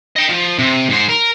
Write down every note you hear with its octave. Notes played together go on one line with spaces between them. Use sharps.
D#5 G5
F3
C3
G#2 C5
A#4